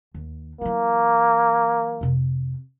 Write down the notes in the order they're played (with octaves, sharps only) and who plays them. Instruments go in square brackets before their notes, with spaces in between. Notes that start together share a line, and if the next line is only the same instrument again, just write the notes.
[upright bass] D#2
[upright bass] E3 F#3 [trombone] A#3
[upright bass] F2 C3